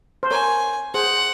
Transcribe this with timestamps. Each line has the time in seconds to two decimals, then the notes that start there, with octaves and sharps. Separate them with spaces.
0.23 C5
0.31 A#4 C#5 G#5
0.94 G#4 C5 F#5